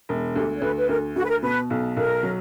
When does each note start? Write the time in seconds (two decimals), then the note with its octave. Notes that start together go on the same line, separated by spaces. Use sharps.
0.09 E1
0.36 D2 G4
0.56 C#5
0.62 D2 B4
0.77 B4
0.89 D2 A#4
1.16 D2 F#4
1.24 B4
1.29 A#4
1.43 B2 B4
1.70 B1
1.97 B1 A#4
2.23 F#3